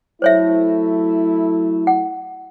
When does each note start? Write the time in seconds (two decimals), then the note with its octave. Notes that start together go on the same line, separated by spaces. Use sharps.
0.22 F#3 A3 E4 C5 C#5 E5
1.87 F#5